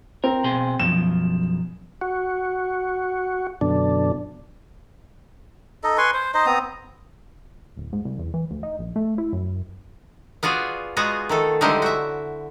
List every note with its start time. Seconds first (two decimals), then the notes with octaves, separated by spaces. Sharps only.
0.24 C4 A#4
0.44 B2 G#4 C5
0.79 F#2 B2 F3 E7
2.01 F#4
3.61 F#2 B2 D3 D4
5.84 D#4 A4 D#5
5.98 B4 G#5 C6 C#6
6.14 C5
6.34 D#4 C5 D#5
6.46 B3 C4 A#5 D#6
7.77 D1
7.93 G#2
8.05 C2
8.18 E2
8.34 E3
8.51 D2
8.63 D#4
8.79 A#1
8.96 A3
9.18 E4
9.33 F#2
10.43 B3 F4 F#4 G#4 D5
10.97 G#3 B3 F4 F#4 G#4 A#5
11.29 D#3 A3 A4
11.61 D3 G3 G#3 D#4 E4 C5
11.82 F#4 E5